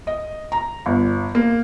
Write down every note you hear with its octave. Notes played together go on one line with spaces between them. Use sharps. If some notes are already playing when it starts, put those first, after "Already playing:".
D#5
A#5
G1
A#3